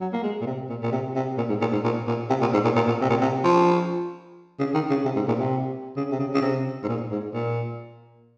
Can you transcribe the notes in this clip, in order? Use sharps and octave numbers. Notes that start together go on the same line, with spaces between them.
F#3
A#3
G#3
A#2
C3
A#2
A#2
C3
C3
A#2
G#2
A#2
G#2
A#2
A#2
C3
A#2
G#2
A#2
A#2
A#2
C3
A#2
C3
F3
C#3
D#3
C#3
C3
G#2
A#2
C3
C#3
C3
C#3
C#3
C3
G#2
A#2
G#2
A#2